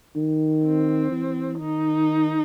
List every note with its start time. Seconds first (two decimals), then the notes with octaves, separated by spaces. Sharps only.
0.16 D#3
0.65 C4
1.11 E3
1.59 D#3 D#4